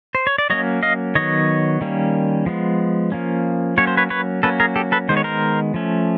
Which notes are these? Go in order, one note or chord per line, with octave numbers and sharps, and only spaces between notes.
C5
C#5
D5
F#3 A#3 C#4 C#5 D#5
D#5 F5
D#3 F#3 B3 C#5 D#5
D#3 G3 A#3 C#4
F3 G#3 B3
F3 A#3 C#4
F#3 A#3 C#4 C#5
C5
B4 C#5
B4 C#5
F#3 A#3 C#4 A4 B4
G#4 A#4
G4 A4
A4 B4
D#3 G#3 B3 C5
C#5
A#4 C5
F3 A3 C#4